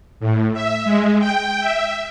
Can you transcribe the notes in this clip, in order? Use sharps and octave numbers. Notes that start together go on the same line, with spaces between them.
A2
E5
G#3
G5
E5